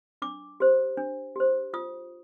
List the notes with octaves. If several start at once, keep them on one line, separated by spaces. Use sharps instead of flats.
D4 D6
G4 C5
D4
G4 C5
F4 D#6